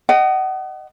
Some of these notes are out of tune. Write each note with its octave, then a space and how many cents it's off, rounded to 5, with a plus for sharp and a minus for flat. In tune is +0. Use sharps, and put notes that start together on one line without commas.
D#5 -15 F#5 +35